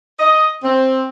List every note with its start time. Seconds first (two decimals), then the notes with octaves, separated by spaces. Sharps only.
0.19 D#5
0.64 C4